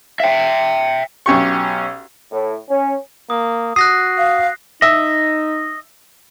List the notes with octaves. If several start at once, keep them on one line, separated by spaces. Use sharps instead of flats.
E5 G5
B1 C#4 G4 C#6
A2
C#4
A#3 D#6
F#4 D#6 F#6 A#6 C7
F5
D#4 D#5 E5